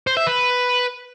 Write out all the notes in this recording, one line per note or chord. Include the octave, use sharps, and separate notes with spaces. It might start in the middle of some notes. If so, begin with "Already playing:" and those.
C5
E5
B4